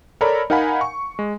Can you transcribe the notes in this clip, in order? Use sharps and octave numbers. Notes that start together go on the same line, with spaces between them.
A4 A#4 C#5 D5 A#5 B5
D#4 A#4 F5 F#5 G#5 B5
C#6
G#3